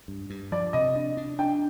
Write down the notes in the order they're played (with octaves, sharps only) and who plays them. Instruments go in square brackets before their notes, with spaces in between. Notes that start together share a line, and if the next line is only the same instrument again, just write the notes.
[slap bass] G2
G2
[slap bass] F3 [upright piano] D5
[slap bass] C3 [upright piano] D#5
[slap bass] D4
D4
[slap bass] D4 [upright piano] G5